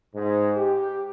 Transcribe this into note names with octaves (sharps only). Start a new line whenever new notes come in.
G#2
G4